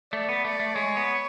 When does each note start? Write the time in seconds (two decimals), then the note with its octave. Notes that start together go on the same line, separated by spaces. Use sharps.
0.12 A3 D5
0.29 B3
0.44 A3 D5
0.60 A3
0.75 G#3 C#5
0.97 B3